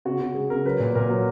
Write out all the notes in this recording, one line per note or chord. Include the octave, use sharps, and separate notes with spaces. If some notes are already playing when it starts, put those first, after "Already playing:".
C#3 F#4
C#3 F#4
G#3 G#4
C#3 A#4
F#3 B4
A#2
A#2 A#4
F#3